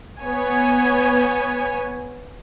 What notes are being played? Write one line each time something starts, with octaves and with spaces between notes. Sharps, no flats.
B3 C#5 G#5